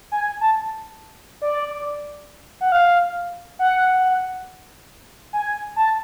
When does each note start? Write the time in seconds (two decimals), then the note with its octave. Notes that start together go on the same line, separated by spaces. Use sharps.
0.12 G#5
0.41 A5
1.42 D5
2.61 F#5
2.72 F5
3.59 F#5
5.33 G#5
5.76 A5